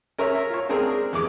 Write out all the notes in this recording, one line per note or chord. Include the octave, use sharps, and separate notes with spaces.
C#4 A#4 C#5 E5
F4 C#5
G#3 C4 D4 G#4 A#4
E2 G#4 D6